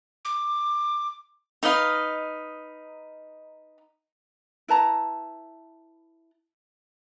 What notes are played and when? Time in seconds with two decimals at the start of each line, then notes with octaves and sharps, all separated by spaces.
0.25 D6
1.63 D#4 B4 D#5 F5
4.68 E4 B4 A5 A#5